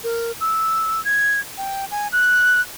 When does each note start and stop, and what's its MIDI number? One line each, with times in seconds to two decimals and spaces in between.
0.04 0.32 70
0.41 1.03 88
1.05 1.40 92
1.58 1.85 79
1.91 2.08 80
2.12 2.61 90